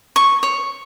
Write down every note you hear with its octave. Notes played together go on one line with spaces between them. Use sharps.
C#6
C#5